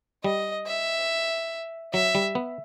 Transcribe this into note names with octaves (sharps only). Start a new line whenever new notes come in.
G3 D#5
E5
F#3 E5
G3
B3